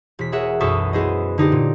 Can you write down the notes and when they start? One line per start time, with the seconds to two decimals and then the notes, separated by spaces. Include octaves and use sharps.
0.19 E1 B6
0.32 G#4 A#4 C#5 E5 F#5
0.60 B1 F#2 A4 C#6 D#6 B6
0.93 B3 E4 G#4 C5 D#5
1.38 D3 D#4 G4 D5
1.52 A#2